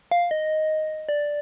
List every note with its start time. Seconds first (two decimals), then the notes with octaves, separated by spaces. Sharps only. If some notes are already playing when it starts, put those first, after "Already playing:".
0.11 F5
0.31 D#5
1.09 D5